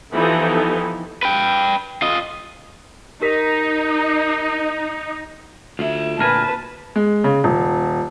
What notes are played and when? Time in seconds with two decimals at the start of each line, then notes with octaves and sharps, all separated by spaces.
0.13 E3 F3 B3 D#4 G4 A4
1.23 B4 G5
2.02 F4 D#5
3.21 D#4 G4 A#4 B6
5.79 D2 F4 E5
6.19 D2 A#2 A#4 B4 G#5 A5
6.96 G#3
7.24 C#3
7.44 D#1